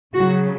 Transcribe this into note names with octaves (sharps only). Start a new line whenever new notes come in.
C#3 F#3 F#4